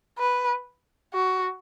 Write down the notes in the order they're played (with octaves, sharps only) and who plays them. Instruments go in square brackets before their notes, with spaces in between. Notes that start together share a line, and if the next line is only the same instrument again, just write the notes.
[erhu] B4
F#4